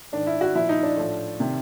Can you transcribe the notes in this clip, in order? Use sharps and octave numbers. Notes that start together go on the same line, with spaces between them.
G#2 D#3 D4
E4
F#4
A#2 F3 E4
D#4
D4
A2 F3
C3 D#3